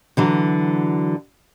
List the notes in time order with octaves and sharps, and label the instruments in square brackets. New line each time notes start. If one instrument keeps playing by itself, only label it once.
[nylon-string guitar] D3 E3 F#3